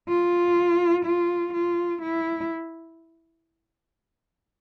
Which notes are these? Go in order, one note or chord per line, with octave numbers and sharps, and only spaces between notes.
F4
F4
F4
E4